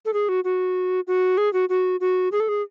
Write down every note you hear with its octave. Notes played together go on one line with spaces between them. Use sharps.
A4
G#4
F#4
F#4
F#4
G#4
F#4
F#4
F#4
G#4
A4
G#4